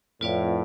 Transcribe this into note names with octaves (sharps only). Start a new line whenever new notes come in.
F2 A2 F4 B4 D5 F5